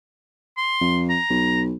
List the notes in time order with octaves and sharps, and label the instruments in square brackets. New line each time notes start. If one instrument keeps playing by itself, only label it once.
[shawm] C6
[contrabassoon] F2
[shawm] A#5
[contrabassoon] B1